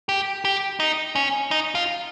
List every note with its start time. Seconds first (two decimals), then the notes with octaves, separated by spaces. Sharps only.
0.09 G4
0.45 G4
0.80 D#4
1.15 C#4
1.51 D#4
1.75 F4